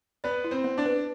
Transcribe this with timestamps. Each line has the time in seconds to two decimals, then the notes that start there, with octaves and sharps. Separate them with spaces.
0.24 B3 B4 D5
0.44 E4
0.51 C4 C5
0.64 B3
0.78 D4 D5
0.86 B4